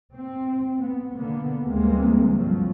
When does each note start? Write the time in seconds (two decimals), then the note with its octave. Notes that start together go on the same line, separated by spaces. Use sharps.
0.14 C4
0.80 B3
1.15 D3 A#3 B3
1.66 D2 E3 G3 G#3 A#3 C4
2.33 C2 G2 F3 F#3